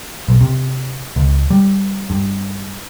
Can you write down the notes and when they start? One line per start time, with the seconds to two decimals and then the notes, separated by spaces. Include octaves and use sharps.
0.28 B1
0.41 C3
1.16 C#2
1.50 G3
2.10 G2